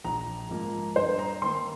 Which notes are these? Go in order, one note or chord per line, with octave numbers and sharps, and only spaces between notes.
A#1 A#5
G#2 F3 A#3
G2 C5
A#5
D#3 A#3 C6